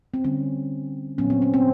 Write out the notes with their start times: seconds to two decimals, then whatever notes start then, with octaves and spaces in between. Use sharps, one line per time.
0.14 C4
0.24 D3 G3 C4 C#4
1.18 A#2 F#3 B3 C#4
1.30 C4
1.42 C#4
1.54 C4